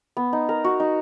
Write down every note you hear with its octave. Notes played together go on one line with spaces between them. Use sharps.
B3
D#4
A#4
F#4
D#4